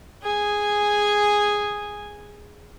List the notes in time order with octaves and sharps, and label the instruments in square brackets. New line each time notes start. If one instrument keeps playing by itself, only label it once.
[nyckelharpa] G#4 G#5